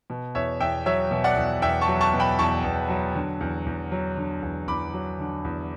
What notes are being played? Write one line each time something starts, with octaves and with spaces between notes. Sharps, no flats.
B2
E2 C#5 E5
E2 E5 G5
F#3 C#5 E5
B2
D5 F#5
E2
E2 E5 G5
A5 C#6
F#3
A5 C#6
B2
G5 B5
E2 A5 C#6
E2
F#3
D3
E2
E2
F#3
D3
E2
E2 B5 D6
F#3
D3
E2